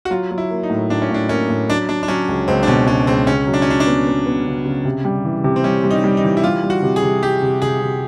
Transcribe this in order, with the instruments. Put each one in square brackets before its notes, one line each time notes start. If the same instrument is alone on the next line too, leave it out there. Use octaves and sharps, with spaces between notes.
[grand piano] F#4
[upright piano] F#3 [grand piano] F4
[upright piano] F#3
[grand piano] E4
[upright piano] A#3
[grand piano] D#4
[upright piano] A2
[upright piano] A2 [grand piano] D4
[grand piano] C#4
[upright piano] A2 [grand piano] D4
[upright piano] A#3 [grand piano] C#4
[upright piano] A2
[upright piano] F#3 [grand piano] D4
[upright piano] F#3 [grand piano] D4
[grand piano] D4
[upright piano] F#3 [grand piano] C#4
[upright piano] C#2
[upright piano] C#2 [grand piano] C4
[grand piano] D4
[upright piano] B2 [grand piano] C#4
[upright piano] C#2 [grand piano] C#4
[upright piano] C#2 [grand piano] C4
[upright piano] C#3 [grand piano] C#4
[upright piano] F#3
[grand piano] D4
C#4
[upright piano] F#3 [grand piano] D4
[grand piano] D4
[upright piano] B3
B3
B3
C#3
C#3
C3
G3
E3
C3
[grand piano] C4
[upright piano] G3 [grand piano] C#4
[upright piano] G3
[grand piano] D#4
[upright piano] G3
[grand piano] D#4
[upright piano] E3
[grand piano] E4
[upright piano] G3 [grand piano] F4
[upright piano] G3
[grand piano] F#4
[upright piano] C3
[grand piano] G#4
[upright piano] C3
[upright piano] G3 [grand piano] G4
[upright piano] C3
[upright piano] C3 [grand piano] G#4
[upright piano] C3